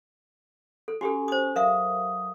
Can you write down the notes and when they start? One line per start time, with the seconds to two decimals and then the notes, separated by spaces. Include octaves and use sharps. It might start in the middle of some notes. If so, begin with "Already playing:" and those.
0.88 A4
1.01 C#4 F#4 G4 A4 G#5
1.28 C5 D#6
1.56 F#3 A#4 E5 F5 D#6